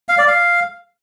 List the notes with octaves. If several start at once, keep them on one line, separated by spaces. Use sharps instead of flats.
F5
D5
F5